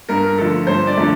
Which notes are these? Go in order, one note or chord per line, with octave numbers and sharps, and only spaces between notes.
G2 A#4
A#4
D3 F3 A3 A4
G2 C5
D5
D3 F3 A3